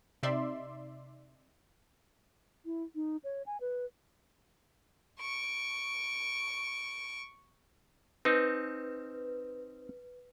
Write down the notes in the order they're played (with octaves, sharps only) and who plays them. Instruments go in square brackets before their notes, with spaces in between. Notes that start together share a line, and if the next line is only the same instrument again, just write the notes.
[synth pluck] C3 D#4 D5 E5 C6
[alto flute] E4
D#4
C#5
G#5
B4
[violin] C#6 D7
[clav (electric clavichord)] C4 D#4 [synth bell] B4